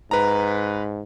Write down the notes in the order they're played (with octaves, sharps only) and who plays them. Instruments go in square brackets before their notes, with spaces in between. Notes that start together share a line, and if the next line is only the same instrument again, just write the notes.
[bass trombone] G#2 [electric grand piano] B4 A#5